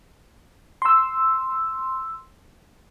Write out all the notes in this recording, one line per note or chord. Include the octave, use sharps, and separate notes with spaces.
C6 E6